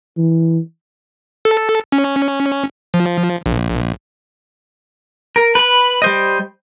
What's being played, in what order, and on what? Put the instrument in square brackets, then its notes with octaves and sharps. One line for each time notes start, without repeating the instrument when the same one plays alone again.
[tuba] E3
[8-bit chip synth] A4
C#4
F3
A#1
[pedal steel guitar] A#4
B4 B5
G3 C5 D#5